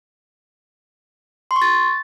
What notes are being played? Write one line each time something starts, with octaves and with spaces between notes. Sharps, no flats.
C6
C#6
A6